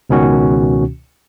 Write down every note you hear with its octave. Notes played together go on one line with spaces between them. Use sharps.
C#2 B2 D#3 C#4 F#4